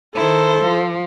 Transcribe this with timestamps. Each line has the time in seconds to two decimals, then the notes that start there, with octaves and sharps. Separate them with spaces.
0.15 D#3 E4 A4 C5
0.61 F3